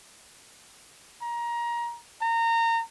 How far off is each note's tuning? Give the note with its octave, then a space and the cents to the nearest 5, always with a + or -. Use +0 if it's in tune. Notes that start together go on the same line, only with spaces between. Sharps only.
A#5 +20
A#5 -25